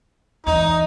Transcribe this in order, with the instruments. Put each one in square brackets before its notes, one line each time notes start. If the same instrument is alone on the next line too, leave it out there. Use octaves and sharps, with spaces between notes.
[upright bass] E2 [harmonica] D#4